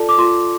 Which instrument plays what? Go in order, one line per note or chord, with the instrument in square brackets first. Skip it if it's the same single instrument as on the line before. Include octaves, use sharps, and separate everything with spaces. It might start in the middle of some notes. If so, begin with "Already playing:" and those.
Already playing: [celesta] F4 A4 D5 A5
D6
F4 C6